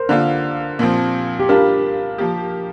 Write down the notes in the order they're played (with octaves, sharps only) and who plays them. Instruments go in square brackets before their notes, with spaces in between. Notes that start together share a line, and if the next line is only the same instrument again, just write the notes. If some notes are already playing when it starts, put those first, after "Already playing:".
Already playing: [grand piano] A#4 C5
[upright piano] D3 A#3 F4 [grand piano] D5
[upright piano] A#2 F3 C4
[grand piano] G4
[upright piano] G3 D4 F4 [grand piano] A#4
[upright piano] F3 A#3 G4